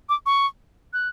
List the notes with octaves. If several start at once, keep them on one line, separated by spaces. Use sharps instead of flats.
D6
C#6
F#6